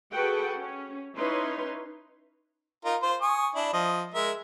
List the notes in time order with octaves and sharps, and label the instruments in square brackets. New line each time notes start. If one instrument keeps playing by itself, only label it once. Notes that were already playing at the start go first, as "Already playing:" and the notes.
[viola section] F#4 G#4 A4 B4 F#5 G5
C#4
C#4 D#4 E4 B4 C#5 C6
[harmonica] D#4 F4 A#4
F4 C5 C6
G#5 C#6 D#6
D4 E4
F3 D#5
G#3 A#4 E5